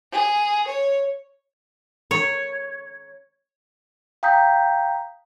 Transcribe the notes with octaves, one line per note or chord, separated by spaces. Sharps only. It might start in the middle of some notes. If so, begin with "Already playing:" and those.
G#4
C#5
C#5
F5 G5 A#5 D#6 G6 B6